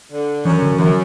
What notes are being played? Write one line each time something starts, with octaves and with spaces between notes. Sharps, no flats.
D3
F#2 E3
D3
F#2 E3